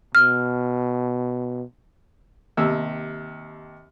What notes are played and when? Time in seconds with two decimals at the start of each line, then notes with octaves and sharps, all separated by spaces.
0.15 B2 F6
2.57 D#2 C3 E6